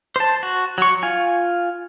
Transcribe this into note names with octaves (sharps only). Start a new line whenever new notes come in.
C5 A5
F#4
F#3 C#6
F4 G#5